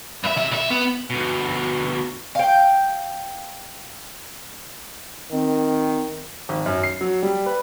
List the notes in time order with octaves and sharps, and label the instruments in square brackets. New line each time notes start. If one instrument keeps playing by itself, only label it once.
[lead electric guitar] G2 E5
C3 E5
C2 E5
B3
[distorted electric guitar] D2 B2
[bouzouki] F5 G5
[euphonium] D#3 [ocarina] C4
[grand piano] G#1
F#2
C7
F#3
G3
B4